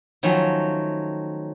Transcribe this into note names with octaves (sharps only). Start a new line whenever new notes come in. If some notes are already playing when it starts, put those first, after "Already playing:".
D#3 F3 F#3 A3 C#4